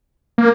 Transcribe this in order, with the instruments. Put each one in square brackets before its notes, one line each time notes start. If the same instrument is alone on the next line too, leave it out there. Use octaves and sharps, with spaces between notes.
[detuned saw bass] A#3